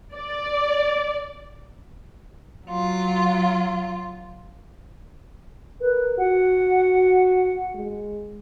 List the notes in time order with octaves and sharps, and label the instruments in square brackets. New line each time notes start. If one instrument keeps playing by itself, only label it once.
[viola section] D5
[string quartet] F#3 F4
[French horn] A#4 [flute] B4
[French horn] F#4 [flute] F#5
[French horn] G#3